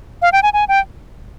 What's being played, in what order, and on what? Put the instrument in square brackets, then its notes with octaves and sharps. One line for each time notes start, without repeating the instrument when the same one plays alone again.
[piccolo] F5
G5
G#5
G#5
G5